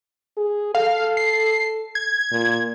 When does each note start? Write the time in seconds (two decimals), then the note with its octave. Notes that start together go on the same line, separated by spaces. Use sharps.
0.38 G#4
0.75 A4 F5
1.17 C7
1.95 G#6
2.32 A#2